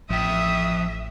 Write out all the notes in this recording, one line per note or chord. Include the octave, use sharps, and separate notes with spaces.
A1 F3 E5 G5 D#6